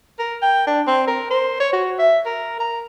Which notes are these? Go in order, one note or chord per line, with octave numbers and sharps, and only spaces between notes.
A#4
G5
D4
C4
A#4
C5
C#5
F#4
E5
A#4
A#5